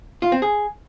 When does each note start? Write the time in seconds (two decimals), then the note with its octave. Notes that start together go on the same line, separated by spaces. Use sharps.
0.22 F4
0.32 C4
0.42 G#4